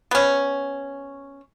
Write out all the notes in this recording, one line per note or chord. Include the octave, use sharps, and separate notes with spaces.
B3 C#4